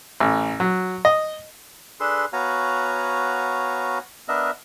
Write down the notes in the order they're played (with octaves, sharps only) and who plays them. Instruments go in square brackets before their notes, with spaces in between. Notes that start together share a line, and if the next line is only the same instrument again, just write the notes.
[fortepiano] A1
F#3
D#5
[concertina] D4 G#4 A4 B4 C6
B3 F#4 C#5 F5 G#5 A#5
B3 D4 A#4 D#5 E5